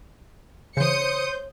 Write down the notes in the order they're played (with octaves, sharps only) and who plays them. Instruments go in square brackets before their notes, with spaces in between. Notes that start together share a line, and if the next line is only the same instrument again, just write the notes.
[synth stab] C#3 E3 [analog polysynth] C5 G6 [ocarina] C#5 [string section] D#6 C#7